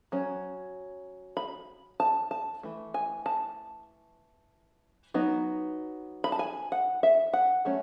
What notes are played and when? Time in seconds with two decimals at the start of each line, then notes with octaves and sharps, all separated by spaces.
0.12 F#3 C#4
1.37 B5
2.00 A5
2.31 A5
2.63 E3 A3
2.94 G#5
3.26 A5
5.14 F#3 B3 D#4
6.24 B5
6.32 A5
6.39 G#5
6.72 F#5
7.03 E5
7.33 F#5
7.65 F#3 A3 C#4